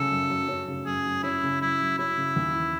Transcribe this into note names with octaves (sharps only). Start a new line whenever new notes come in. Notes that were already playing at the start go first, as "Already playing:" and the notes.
Already playing: C#3 F#3 C#4 A4
F#2
F#3
C#4
C#3
F#2 G#4
F#3
C#4 E4
C#3
F#2 E4
F#3
C#4 E4
C#3
D#2
E3